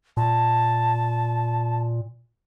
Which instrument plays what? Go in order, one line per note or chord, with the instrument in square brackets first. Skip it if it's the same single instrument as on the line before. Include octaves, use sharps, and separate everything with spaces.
[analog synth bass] A#2 [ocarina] A5